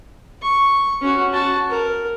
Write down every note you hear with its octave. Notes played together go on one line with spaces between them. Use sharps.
C#6
C#4 F#4
F#4 A5
A#4